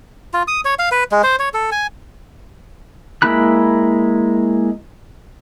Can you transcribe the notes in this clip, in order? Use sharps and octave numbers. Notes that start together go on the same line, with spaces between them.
F4
D#6
C#5
F5
B4
G#3
C5
C#5
A4
G#5
G#3 A#3 E4 B5 F#6